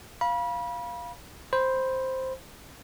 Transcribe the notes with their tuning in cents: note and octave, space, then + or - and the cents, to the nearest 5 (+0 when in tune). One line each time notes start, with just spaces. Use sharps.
F5 +0 B5 -30
C5 +0 B5 +0